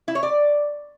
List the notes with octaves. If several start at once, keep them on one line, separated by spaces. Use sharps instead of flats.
E4
C#5
D5